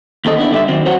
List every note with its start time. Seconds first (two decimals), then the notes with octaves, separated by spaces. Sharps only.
0.25 D#2 C4 A4 D#5
0.37 B3 D4 E4
0.51 D3 G3 D#5 E5
0.68 D#3 F#3 C4
0.86 F#4 C5 C#5 F#5